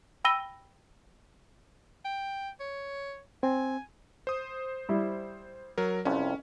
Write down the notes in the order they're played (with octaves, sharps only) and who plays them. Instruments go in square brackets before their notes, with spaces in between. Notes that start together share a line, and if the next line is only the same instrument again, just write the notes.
[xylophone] G5 B5 E6 A#6 D#7 G7
[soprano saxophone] G5
C#5
[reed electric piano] C4 [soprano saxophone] G#5
[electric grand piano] C5 D#6
[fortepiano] G3 E4
[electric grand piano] F#3 A#4
[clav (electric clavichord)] C2 F2 [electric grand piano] C#4